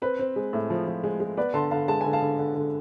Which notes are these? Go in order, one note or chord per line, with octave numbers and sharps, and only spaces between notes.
C4 B4
C4
G#3
A2
F3
F3
G#3
G#3
B3 B4 D5
D3 A5 C6
D3 F5 A5
G#3 A5
D3 G#5
F5 A5
D3
D3
D3